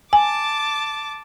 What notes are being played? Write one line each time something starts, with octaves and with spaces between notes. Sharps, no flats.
G#5 A5 D6